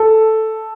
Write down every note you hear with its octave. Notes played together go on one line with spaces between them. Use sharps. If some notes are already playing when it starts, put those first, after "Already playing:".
Already playing: A4